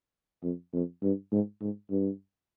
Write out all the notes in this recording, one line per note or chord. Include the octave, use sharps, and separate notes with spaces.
F2
F2
G2
G#2
G#2
G2